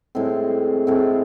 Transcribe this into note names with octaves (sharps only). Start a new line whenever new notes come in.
A2 G#3 C4
A2 G#3 C4